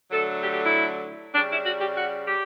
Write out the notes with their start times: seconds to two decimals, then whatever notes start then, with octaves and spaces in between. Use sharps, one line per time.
0.11 D3 F#3 A3 A4
0.42 G4
0.52 G4
0.62 E4
1.33 C#3 G3 D4
1.49 E4
1.64 F#4
1.79 G4
1.95 F#4
2.26 G4